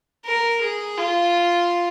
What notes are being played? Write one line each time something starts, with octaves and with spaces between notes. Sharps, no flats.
A#4
G#4
F4